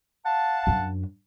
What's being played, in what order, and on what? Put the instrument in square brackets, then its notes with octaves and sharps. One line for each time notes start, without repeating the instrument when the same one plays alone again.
[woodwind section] F5 F#5 A5
[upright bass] F#2 D4